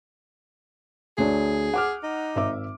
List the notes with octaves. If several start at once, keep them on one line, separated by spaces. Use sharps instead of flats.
D2 D4 G#4 C#5
F#5 D6 F6
D#4
G#1 E5 D6